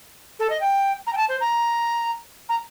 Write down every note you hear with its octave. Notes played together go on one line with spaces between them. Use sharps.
A4
D#5
G5
A#5
G5
A5
C5
A#5
A#5